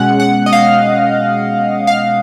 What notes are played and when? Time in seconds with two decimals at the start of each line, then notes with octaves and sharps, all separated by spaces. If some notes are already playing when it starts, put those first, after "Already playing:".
Already playing: B2 G#3 C#4 F#5
0.20 F#5
0.46 D#5
0.53 F5
1.87 F5